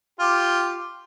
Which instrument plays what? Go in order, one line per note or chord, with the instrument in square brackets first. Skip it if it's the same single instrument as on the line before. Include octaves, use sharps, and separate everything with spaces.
[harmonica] F4 G4